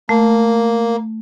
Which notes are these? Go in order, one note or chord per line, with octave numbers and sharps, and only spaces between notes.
A3 A#3